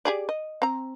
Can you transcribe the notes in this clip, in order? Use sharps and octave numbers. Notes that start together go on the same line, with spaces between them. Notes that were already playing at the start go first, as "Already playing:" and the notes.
G4 G#4 D5
D#5
C4 A#5